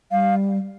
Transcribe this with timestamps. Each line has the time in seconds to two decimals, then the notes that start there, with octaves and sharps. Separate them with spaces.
0.12 G3 F5